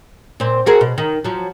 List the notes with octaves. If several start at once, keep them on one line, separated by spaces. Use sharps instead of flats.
A#2 C4
F#4 G#4 A#4
B2
D#3
F3 F#3